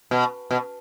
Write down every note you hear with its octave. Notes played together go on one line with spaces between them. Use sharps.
B2
B2